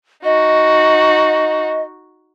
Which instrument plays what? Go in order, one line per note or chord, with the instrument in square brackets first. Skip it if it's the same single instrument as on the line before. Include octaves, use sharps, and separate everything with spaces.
[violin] D#4 F#4 [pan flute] D#5